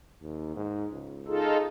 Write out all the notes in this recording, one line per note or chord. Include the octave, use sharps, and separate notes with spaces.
D#2
G#2
C#2
D#4 F4 G#4 A4